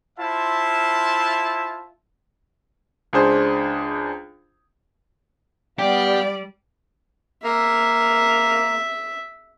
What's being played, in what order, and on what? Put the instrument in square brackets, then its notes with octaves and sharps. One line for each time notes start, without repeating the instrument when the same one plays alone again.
[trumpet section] E4 F4 C5 E5 F5 A5
[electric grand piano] C#2 D4 G#4 C5
[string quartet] G3 D5 [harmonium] B3 F5 [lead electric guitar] G4
[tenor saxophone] A#3 [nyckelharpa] E5